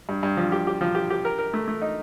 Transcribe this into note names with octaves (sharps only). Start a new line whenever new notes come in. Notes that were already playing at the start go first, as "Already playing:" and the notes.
G2
G2
F3
G4
G4
F3
G4
G4
A#4
A#4
A3
A3
D#4